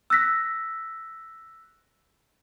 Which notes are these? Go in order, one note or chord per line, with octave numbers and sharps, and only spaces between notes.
E6 F#6 A#6 B6